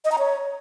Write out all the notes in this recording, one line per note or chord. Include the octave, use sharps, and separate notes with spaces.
D#5
A#5
C#5